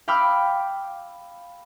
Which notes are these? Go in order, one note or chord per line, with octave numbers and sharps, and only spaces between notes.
F5 G5 B5 D6 E6 F6